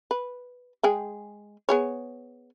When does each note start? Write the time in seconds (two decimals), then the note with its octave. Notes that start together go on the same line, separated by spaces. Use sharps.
0.11 B4
0.83 G#3 G#4 G5
1.69 B3 G#4 C#5